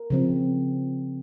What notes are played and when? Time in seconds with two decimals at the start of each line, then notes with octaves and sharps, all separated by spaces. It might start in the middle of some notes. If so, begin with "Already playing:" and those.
Already playing: A#4
0.10 C#3 F3 C4